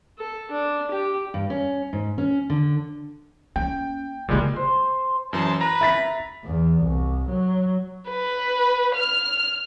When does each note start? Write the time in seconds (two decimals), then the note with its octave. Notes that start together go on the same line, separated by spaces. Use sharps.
0.18 A4
0.51 D4
0.91 G4
1.34 G2
1.50 C#4
1.93 G#2
2.18 C#4
2.50 D3
3.56 A#3 C#4 G5
4.28 A#2 C#3 G3 G#3 F4
4.56 C5
5.33 F#2 E3 C5 A5 C6
5.61 B4 A#5 B5 A#6
5.81 E5 A6 B6
6.45 E2
6.82 C2
7.30 F#3
8.10 B4
8.95 F6